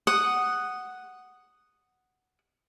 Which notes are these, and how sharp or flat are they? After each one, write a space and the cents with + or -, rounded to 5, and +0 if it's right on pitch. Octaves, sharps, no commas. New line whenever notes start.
F#5 +0 D#6 -5